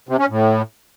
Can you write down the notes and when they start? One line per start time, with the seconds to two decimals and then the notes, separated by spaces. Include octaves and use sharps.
0.09 C3
0.19 C#4
0.29 A2